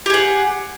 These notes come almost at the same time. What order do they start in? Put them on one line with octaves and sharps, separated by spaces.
G4 G#4 F#5